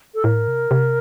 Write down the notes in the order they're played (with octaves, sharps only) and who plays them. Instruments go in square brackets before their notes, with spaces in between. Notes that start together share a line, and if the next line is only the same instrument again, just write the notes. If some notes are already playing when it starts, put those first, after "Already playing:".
[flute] A4
[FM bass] A2 [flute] A#4
[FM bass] C3
C3